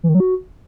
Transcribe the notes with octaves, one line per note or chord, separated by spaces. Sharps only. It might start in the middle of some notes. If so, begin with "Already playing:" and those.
E3
D#3
F#3
F#4